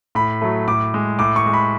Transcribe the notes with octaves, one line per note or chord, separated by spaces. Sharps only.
A2 B5
F#3 A3
A2 D6
G#3
A2 D6
C#6
G#3
B5